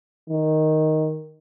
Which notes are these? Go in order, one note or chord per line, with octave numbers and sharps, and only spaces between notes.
D#3